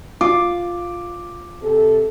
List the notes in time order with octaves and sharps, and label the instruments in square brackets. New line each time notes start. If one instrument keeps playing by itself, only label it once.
[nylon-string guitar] F4 [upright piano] D6
[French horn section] C3 A4